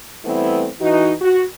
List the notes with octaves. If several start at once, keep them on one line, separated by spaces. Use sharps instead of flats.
E3 G3 A3 B3 C4 E4
E3 D#4 F#4
F#4